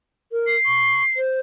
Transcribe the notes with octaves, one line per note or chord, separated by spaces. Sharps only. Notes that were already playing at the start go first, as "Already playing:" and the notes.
A#4
C7
C#6
C5